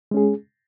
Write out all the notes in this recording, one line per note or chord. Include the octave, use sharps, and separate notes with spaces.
G#3 C#4 G#4